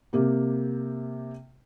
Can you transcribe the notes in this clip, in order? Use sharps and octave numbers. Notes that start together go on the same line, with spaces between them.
C3 A#3 G4